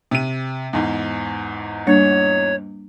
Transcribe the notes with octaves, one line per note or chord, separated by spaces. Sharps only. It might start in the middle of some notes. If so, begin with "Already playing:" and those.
C3 D#7
E2 G#2
G3 A#3 D4 C#5